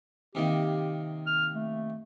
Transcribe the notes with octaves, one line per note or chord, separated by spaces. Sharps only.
C3 D#3 A#3 G4
F6
A3